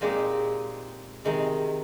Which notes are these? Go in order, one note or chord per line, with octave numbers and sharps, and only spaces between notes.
A#2 G#3 C4 D#4 G4
C3 D#3 G#3